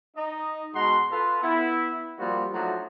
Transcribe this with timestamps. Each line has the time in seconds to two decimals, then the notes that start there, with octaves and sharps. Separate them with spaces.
0.17 D#4 D#5
0.75 B2 G#3 F#4 F#5 A#5 C6
1.11 F4 A4 B4
1.43 B3 E4
2.19 F3 G3 A#3 C4 F4 F#4
2.52 F3 F#3 A3 D4 D#4 F#4